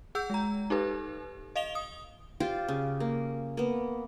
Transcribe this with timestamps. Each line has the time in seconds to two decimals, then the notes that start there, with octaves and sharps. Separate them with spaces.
0.15 G#4 F#5 E6 G6
0.30 G#3 A#5
0.70 D#4 G4 A4 B4
1.55 D#5 F5 F7 G7
1.75 D#6
2.40 F4 G4 C5 D5
2.68 C#3
3.00 A#3
3.57 A#3 B3